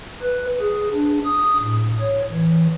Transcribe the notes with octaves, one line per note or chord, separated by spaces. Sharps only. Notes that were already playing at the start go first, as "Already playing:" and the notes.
B4
G#4
D4
D#6
A2
C#5
E3